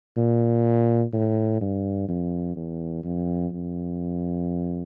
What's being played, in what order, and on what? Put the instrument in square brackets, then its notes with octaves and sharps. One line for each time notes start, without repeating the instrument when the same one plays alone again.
[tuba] A#2
A2
G2
F2
E2
F2
F2